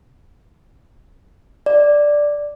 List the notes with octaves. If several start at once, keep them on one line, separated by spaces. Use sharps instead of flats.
D5